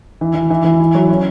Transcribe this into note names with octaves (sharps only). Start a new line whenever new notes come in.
E3
E3
E3
E3
E4
F#3
C#4